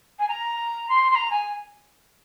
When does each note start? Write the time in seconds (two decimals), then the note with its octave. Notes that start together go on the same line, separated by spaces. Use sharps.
0.19 G#5
0.28 A#5
0.89 C6
1.10 C6
1.15 A#5
1.31 G#5